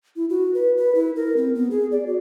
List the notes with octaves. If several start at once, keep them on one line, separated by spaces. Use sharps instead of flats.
E4
F#4
B4
B4
E4
A#4
C4
B3
G#4
D5
F#4